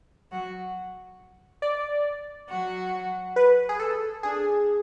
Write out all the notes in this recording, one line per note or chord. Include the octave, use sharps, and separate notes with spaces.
F#3 F#4
D5
F#3 F#4
B4
G#4
A4
D4 G#4